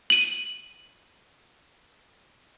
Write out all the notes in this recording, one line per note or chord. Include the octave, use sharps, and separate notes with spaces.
D#7 F#7